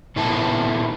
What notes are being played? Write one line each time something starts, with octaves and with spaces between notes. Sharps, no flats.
A#2 D#3 B3 E4 A4